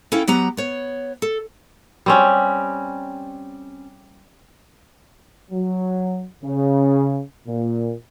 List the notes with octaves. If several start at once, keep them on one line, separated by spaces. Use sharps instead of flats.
C#4 E4 A4 F5 G5
F#3 B3 G4 F#5 A#5
B3 C#5
A4
G3 C4 C#4
F#3
C#3
A#2